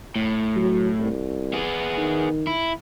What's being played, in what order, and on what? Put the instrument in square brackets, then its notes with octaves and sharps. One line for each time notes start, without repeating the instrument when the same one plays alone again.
[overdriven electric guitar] A2
[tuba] F#3
C2
[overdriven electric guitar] B3 G#4
[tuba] D#3
[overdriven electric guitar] E4